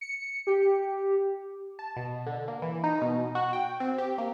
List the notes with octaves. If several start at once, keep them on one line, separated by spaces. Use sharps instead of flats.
C#7
G4
A5
B2
D3
A#3
E3
D#4
B2
F#4
G5
C4
G4
A#3